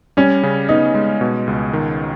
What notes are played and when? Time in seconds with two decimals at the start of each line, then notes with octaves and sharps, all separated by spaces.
0.17 G3 C#4
0.43 C#3
0.69 B3 D#4
0.95 G#3
1.21 B2
1.47 C#2
1.73 D#3